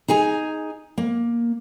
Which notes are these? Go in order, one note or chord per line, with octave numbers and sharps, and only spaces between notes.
D#4 G#4 G#5 A#5
A#3